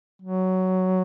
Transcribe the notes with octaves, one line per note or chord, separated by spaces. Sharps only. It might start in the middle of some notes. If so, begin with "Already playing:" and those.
F#3